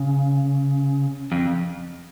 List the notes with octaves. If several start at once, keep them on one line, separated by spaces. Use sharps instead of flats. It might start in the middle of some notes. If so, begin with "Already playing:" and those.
Already playing: C#3
F2